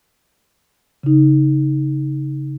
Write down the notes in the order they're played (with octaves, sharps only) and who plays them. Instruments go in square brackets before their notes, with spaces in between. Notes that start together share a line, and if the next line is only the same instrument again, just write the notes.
[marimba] C#3 D#4